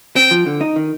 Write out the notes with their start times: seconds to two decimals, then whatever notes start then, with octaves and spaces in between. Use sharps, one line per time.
0.16 C4 G5
0.31 F3
0.46 D3
0.61 D#4
0.76 D#3